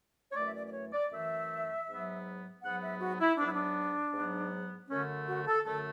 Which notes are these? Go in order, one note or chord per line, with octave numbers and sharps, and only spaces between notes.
C#5
F#2 E3 A3 D5
E5
D5
D5
C#5
D5
F#2 E3 A3 E5
G#2 F#3 B3
G#2 F#3 B3 F#5
E5
F#4
E4
G#2 F#3 B3 D4
E4
D4
G#2 F#3 B3
F#2 D3 A3 C#4
F#4
A4
F#2 D3 A3 A4